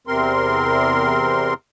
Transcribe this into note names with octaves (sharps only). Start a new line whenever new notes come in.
E2 C3 C4 A#4 C6